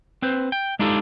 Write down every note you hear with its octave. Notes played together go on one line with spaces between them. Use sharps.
C4 B4 C5
G5
G#3 D4 D#4 F4 G4 A4